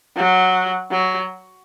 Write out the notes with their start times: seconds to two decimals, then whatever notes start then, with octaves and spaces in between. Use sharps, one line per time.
0.17 F#3
0.91 F#3